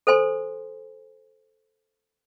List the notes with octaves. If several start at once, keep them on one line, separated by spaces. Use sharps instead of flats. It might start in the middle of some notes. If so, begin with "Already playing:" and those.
A4 C5 G#5 C6